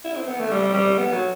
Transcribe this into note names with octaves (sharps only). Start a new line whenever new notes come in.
E4
C4
B3
A3
G3
G3
B3
F#3